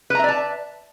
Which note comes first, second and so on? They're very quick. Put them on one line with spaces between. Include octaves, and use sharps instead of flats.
B4 A#5 E5 D5 A5